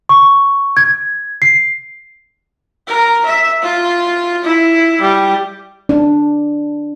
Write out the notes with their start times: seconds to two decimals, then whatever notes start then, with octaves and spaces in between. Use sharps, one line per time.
0.09 C#6
0.77 G#6
1.42 C7
2.88 A#4
3.26 E5
3.63 F4
4.44 E4
5.01 G3
5.89 D4